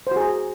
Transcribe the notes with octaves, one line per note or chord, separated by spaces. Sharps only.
F#4 G#4 C5 A#5